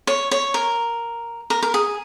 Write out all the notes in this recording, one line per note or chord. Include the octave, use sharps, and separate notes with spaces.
C#5
C#5
A#4
A#4
A#4
G#4